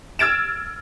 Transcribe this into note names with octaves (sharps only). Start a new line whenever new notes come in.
E6 F6 G#6 A6 D7 E7